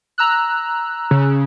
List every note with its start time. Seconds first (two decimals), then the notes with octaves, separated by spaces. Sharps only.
0.18 A#5 E6 F#6
1.11 C#3